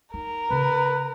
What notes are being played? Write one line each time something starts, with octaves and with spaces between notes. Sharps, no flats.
D#4 A#4
C#3 C#4 B4